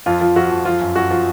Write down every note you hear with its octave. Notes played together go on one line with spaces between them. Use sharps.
F2 F4
F3
F2 F#4
F2
F3 F4
F#2
F#2 F#4
F3